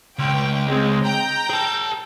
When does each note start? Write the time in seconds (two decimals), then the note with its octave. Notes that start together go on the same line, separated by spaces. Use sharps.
0.19 C#2 G5
0.67 G#3 C4
1.03 G5 A#5 G6
1.50 G#4 A5